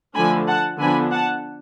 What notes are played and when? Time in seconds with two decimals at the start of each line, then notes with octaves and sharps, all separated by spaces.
0.15 D3 F3 A3 D4 G#5 B5
0.48 F#5 A5
0.80 D3 F3 B3 D4 G#5 B5
1.12 F#5 A5